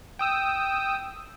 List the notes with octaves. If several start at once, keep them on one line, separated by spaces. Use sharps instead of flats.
G5 D#6 E6